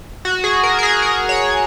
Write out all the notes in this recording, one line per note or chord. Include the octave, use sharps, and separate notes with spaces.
F#4
G#4
A#4
A#4
G#4
A#4
C#5